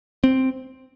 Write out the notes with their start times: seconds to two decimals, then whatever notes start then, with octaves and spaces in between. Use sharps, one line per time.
0.24 C4